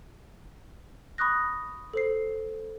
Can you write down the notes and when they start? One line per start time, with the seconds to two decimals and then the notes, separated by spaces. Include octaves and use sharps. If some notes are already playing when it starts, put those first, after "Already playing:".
1.18 B5 C#6 D#6 F#6 A#6
1.93 A4 C5 C7